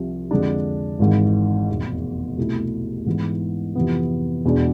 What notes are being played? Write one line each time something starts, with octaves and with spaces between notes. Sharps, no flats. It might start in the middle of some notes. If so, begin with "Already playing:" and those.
Already playing: C2 C3 F3
F2 D3 G#3 D4
G#1 G#2 E3
F1 E2 B2
C2 B2 A3 E4
G#2 E3 B3 E4
F2 C3 E3 B3
E1 E2 B2 G#3 D4